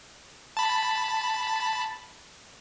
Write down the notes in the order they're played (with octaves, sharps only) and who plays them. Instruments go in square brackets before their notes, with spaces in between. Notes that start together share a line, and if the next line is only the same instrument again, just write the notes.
[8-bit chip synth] A5 B5